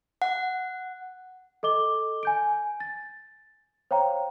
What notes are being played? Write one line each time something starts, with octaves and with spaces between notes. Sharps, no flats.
F#5
A4 D#5 D6 G7
G#5 G6 D7
A6
C5 C#5 F5 G5 A#5